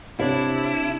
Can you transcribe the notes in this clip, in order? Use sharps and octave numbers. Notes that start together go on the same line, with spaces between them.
C3 D4 E4 C#5 F5